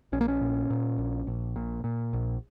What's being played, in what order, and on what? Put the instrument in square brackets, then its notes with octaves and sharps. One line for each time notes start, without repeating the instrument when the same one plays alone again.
[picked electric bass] A#1 C#4
A#3
C#4
A#2
A#2
A#1
A#1
A#2
A#2
A#1